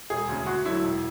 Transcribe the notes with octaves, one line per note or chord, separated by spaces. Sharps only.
E1 G#4
D2 C#3
D2 F#4
D3 F#3 E4
E1